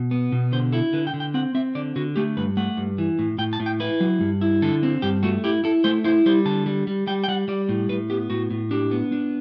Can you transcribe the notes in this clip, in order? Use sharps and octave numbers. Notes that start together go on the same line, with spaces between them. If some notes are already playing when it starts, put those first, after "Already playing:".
Already playing: B2
B3
B2
D3 C5
E4 A4
D3 B4
G5
D3
G5
C4 F#5
C4 E5
D3 D5
D3 F#4
A3 G4
G2 B4
A3 F#5
G2
E3
A2
A2 G5
A5
A2
G5
E4 B4
F#3
G2
E4
D3 A4
C4
G2 G4
A3 F#4
E4 G4
E4 A4
A3 C5
E4 C5
G3 C5
D3 A5
G3
G3
G3 G5
G5
G3 F#5
G3 D5
A2
A2 B4
B3 G4
A2 F#4
A2
D4 G4
B3
D4